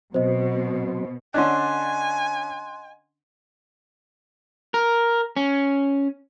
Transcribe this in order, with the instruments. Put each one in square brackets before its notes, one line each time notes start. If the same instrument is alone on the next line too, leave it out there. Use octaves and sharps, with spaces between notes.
[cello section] B2 [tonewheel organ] F#3 C4 [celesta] C5 D#5
[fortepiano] D3 C#4 D4 [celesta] D#5 F#5 [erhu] G#5 [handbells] C6 F#6
[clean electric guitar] A#4
C#4